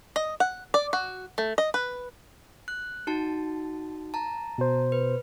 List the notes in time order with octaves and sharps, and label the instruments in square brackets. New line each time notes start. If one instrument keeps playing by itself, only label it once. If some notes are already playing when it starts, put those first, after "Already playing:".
[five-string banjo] D#5
F#5
D5
F#4
A3
D#5
B4
[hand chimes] F#6
D#4 F#4 A5
A5 A#5
[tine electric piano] B2 C5
[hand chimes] B4